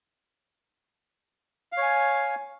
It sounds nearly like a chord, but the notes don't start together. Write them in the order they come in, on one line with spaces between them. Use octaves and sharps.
F5 C#5 G#5